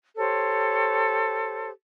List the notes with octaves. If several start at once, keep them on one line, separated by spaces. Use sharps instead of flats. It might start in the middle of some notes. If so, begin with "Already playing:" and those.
G4 A4 C5 C#5